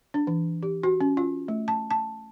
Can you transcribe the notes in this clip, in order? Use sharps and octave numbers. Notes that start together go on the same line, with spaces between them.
D4
E3
G4
F#4
C#4
F4
A3
A5
A5